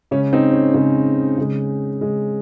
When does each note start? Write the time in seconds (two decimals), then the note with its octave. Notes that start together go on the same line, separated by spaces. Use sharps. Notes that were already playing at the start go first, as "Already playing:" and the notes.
0.11 C#3 G#3 C#4
0.33 C4 D#4
0.53 C#4
0.74 C#3 G#3 C4
1.38 C#3 G#3
2.01 C#3 G#3